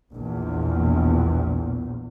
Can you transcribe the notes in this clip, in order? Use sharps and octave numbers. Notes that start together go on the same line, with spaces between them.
A#1 E2